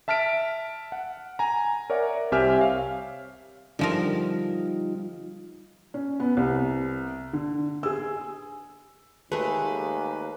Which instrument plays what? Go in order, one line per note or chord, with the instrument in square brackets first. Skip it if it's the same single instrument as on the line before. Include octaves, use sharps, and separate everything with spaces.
[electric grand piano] E5 A5 F6 B6 D7
F#5
G#5 A#5
A#4 C#5 D5 E5 F#5
C2 C4 G4 E5 G#5 F6
C#5 F5
[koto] D3 F3 A#4 [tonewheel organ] G3 D#4 F4
[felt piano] C#4
B3
C2
D3
G#4 E6
[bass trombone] D#2 [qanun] G#3 A3 [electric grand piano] B4